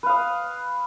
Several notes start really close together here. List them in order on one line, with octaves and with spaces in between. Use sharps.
B4 F5 D#6